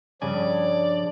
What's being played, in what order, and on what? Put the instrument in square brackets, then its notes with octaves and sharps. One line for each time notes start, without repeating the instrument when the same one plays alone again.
[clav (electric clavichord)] G2 C#3 G#5 [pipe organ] F3 D4 [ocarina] C#5 [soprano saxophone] D5